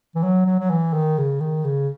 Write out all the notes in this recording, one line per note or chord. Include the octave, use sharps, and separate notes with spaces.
E3
F#3
F#3
F#3
E3
D#3
C#3
D#3
C#3